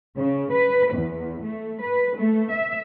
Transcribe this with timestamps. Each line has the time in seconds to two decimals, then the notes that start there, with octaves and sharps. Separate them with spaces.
0.16 C#3
0.52 B4
0.92 E2
1.43 A3
1.81 B4
2.16 A3
2.51 E5